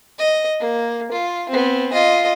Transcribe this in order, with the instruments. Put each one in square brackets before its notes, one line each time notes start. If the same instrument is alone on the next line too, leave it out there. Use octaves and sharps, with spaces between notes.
[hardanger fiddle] D#5
A#3
F4
B3 C4
F4 D#5